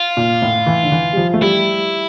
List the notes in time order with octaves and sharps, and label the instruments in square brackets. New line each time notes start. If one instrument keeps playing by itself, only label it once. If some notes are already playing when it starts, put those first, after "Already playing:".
Already playing: [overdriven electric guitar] F4
[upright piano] A#2
A2
E3
D3
E3
G3
F3
A3
[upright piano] G3 [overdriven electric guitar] E4